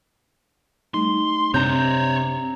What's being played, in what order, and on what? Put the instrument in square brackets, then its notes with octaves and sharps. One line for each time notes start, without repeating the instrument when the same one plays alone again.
[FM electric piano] G3 A3 D#4 [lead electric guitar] C6
[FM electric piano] F#2 D4 [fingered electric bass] C3 [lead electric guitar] C5 C#5 [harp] A#5 G6